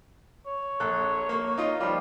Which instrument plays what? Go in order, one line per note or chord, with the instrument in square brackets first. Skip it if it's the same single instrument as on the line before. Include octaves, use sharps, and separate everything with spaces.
[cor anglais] C#5
[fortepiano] A#1 A4 F#6
A#3
D#4 F4 D#5
[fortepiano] F3 F4 [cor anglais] G3